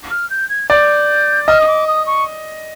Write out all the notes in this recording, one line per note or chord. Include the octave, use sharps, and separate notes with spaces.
F6
G6
G#6
D5 G6
D#5 F6
D#6
D6
D#6
C#6